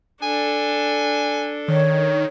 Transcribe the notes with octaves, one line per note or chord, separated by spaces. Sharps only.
D4 A4 G#5
D#3 C#5